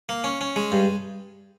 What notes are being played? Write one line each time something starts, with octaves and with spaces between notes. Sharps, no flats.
A#3
C#4
C#4
G#3
G2